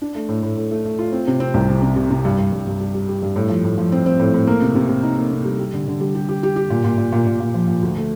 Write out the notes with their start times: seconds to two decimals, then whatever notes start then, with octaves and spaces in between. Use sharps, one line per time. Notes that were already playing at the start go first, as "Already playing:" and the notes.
0.02 D4
0.15 A3
0.29 A2
0.43 A2
0.56 A2
0.71 A3
0.85 A3
0.99 F4
1.12 C4
1.27 C3
1.40 C4
1.54 C2
1.69 C3
1.82 C3
1.96 C3
2.11 C3
2.25 G2
2.38 G2
2.52 G2
2.67 G2
2.80 G3
2.94 G3
3.09 G3
3.22 G2
3.36 A2
3.49 F3
3.64 A2
3.78 F3
3.92 C4
4.06 C4
4.19 A2
4.34 A2
4.47 A#3
4.62 C3
4.75 C3
4.89 C3
5.03 D#4
5.17 A#3
5.31 C3
5.45 G3
5.59 G3
5.73 D3
5.87 D3
6.01 G3
6.15 G4
6.29 G4
6.43 G4
6.56 G4
6.70 A#2
6.85 A#2
6.98 A#2
7.12 A#2
7.27 A#2
7.40 A#2
7.54 F3
7.68 A#2
7.83 D2
7.97 A3